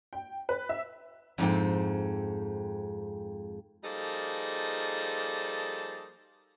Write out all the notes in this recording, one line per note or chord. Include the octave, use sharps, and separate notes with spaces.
G5
B4
E5
F2 G#2 C4
F3 G3 A#3 D#4 G#4 A4